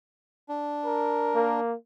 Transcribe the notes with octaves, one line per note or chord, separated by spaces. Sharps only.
D4
A#4
A#3